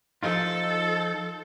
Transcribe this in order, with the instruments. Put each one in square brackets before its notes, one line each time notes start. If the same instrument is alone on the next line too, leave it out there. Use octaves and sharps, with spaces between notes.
[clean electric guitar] F3 D#4 F4 [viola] A4